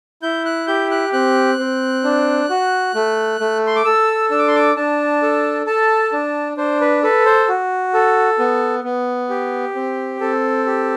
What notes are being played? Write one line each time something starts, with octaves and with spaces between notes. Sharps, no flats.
E4 G6
F#6
G4 G6
F#6
C4 F#6
C4
D4
F#4
A3
A3
C6
D6
A4 E6
D4 E6
D6
C6
D6
D4 A5
A4
A4 A5
D4
D4 C5
B4
A4 B4
C5
F#4
A4
B3
B3
G4
C4
C4 A4
G4